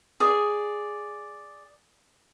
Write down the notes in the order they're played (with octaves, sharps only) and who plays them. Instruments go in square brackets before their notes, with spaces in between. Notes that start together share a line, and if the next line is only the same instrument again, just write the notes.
[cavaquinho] G#4 D5